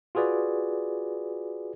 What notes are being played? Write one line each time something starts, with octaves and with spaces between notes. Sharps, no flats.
F4 F#4 G#4 B4 D5